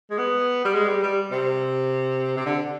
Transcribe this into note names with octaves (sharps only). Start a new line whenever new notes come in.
G#3
B3
G3
G#3
G3
G3
C3
C3
D3